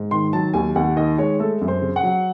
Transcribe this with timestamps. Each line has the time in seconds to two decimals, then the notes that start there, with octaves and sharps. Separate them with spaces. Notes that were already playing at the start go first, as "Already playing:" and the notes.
Already playing: G#2
0.11 D#3 C6
0.33 F#3 A5
0.54 D#2 G#5
0.75 D#2 F#5
0.97 D#3 D#5
1.18 G#3 C#5
1.39 A3 A4
1.61 F#2
1.68 C5
1.82 C#3
1.96 F#5
2.03 F#3